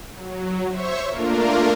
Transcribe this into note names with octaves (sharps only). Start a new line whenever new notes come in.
F#3
C5 C#5 E5 C#6
A3 A#3 D4 F4 A#4